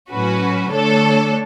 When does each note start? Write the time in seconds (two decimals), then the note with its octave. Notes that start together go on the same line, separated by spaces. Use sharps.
0.11 A2 F#3 C#4 F#4 B4
0.71 D3 A3 D4 A4 C#5